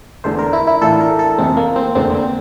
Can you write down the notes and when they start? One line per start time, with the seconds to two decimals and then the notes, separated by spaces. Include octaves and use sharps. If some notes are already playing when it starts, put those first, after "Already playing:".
0.24 E2 D3 A3 D4 C5
0.39 A#4
0.53 E4
0.67 E4
0.81 A2 E3 A3 D4 F4 A4
1.00 A#4
1.19 A4
1.38 F2 C3 E3 A3 C4
1.57 A#3
1.76 C4
1.95 F1 E2 D3 A3 C4 D4
2.15 C4